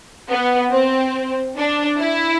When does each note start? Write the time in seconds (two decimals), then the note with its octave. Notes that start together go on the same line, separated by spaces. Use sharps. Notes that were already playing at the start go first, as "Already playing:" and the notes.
0.29 B3
0.72 C4
1.57 D4
1.99 E4